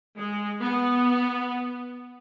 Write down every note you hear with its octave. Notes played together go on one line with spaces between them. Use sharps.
G#3
B3